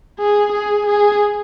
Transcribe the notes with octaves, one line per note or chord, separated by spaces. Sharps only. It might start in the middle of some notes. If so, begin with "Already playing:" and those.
G#4
G#4
G#4